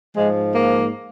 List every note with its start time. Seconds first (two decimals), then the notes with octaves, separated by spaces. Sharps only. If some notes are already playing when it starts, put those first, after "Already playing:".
0.16 G#2 F3 G#3
0.53 A#3